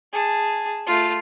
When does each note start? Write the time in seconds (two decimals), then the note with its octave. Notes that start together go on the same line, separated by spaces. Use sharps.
0.13 G#4 A5
0.87 A3 F4